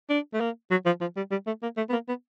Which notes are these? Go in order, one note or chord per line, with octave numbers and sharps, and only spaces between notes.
D4
A3
A#3
F#3
F3
F3
G3
G3
A3
A#3
A3
B3
A#3
B3